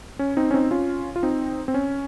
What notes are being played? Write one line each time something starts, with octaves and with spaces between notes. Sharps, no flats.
C#4
C4 D#4
C#4
C4 D#4
C#4 F4
F4
C4 D#4
C4
C#4